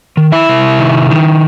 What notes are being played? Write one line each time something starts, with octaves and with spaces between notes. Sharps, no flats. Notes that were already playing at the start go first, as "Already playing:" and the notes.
D#3
E4 E5
C3
D#3
D#3